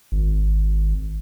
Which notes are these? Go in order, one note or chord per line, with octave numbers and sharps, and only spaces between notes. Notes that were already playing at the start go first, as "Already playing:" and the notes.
G#1